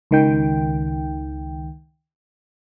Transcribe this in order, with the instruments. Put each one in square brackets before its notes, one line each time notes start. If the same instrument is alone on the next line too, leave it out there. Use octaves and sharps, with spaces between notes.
[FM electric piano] C#2 D#3 G5